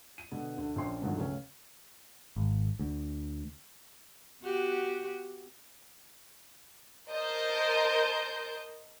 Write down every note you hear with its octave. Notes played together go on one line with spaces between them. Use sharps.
D#7
B2 D3 B3
D2 D3
A#1 C#4 C6
G2 B2 D3 D#3 F3 F#3
C#2 A3 C#4 F5
G#1
D2
B3 F#4 G4
A#4 C5 D#5 A5 G6